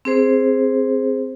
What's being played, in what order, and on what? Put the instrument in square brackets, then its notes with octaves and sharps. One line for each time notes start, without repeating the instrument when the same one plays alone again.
[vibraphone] C4 G#4 C5